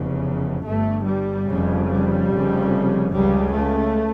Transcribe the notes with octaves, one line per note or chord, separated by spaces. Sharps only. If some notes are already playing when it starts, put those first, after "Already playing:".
Already playing: F1 E2 C#3
G1 G2 A3
G3
F1 F2 C#3
G3
F1 F2 C#3
C#2 C#3 G3
A3